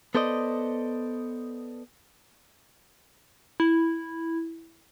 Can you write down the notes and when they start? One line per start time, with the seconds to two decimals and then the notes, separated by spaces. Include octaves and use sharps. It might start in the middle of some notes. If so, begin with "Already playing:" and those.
0.15 B3 A4 C5 D5 D#5
3.60 E4